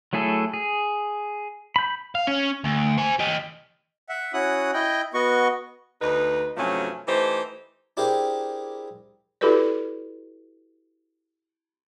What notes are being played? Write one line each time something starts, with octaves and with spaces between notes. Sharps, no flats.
F#3 A3 E4 G#4 A4
G#4
B5 G6
F5
C#4
D2
C5 G#5
G4 D#5
E5 F#5
C#4 E4 F#4 F#5 D#6 F#6
E4 D#5 G5
B3 F#4 D#5 C#6
D2 D#4 B4
G2 C3 F3 F#3 A3 C#4
E3 A3 D#4 G4 C5
D4 E4 G4 G#4 A#4 C5
E4 F#4 G4 A4 B4 D5